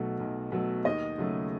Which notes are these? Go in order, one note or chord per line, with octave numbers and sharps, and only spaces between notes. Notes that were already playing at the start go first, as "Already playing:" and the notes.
Already playing: B1 B2 F#3 A3 A4
B1
B2 F#3 A3
D#2 D#5
C#3 F#3 A3